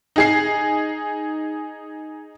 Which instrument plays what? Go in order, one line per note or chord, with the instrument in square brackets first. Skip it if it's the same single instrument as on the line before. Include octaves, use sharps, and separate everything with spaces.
[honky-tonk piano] D#4 G#4 C7